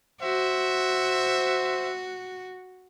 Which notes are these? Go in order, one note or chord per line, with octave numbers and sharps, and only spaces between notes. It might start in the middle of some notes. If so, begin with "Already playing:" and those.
F#4 C5 E5